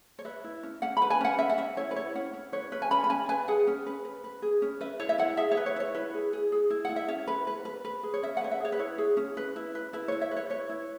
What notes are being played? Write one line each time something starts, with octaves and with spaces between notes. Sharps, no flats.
C#5
B4 E5
E4
C#4
C#4 F#5
B5
B4
G#5
C#4 F#5
C#4 E5
F#5
C#4 E5
E4 C#5
B4
E4 C#5
C#4 F#5
C#4
B4 C#5
C#4 B4
G#5
C#4 B5
B5
C#4 G#5
B4 G#5
G#4 F#5
C#4
B4
B4
B4
G#4
C#4
B4 E5
E4 C#5
E5
E4 F#5
G#4 E5
C#5
B4
C#5
E4 C#5
E4 B4
G#4
G#4
G#4
E4
E4 F#5
E5
C#4 C#5
B4
B4
B4
B4
G#4
C#5
C#4 E5
F#5
B4 C#5
E5
G#4 C#5
B4
E4 C#5
G#4
C#4
B4
E4
B4
E4 B4
E4 C#5
E5
B4
C#5
B4 C#5
E4